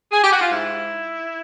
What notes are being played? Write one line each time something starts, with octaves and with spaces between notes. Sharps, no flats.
G#4
G4
F#4
F4
G#2 E4